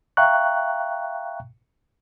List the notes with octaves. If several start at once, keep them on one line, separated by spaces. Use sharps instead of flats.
E5 F5 G5 A#5 C#6 F#6